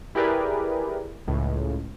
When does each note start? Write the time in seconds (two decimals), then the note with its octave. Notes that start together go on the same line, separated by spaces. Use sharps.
0.15 E4 G4 G#4 A#4 B4 D5
1.28 C#2 A2